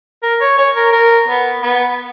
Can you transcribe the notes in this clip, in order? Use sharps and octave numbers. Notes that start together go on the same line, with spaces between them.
A#4
C#5
C#5
A#4
A#4
B3
B3